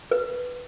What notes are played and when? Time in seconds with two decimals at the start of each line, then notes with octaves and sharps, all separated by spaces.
0.11 B4